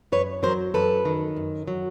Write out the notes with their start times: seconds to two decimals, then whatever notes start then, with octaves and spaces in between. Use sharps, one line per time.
0.12 F#2 B4 C#5
0.43 F#3 A#4 C5
0.74 F#2 A4 B4
1.05 D#3
1.36 F#2
1.68 F#3